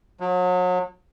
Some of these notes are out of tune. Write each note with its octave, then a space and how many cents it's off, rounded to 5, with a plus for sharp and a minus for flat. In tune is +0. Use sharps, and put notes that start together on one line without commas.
F#3 -35